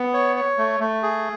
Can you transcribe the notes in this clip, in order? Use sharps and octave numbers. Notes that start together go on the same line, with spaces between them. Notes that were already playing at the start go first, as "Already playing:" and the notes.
Already playing: B3
C#5
C#5
A3
A3
G#4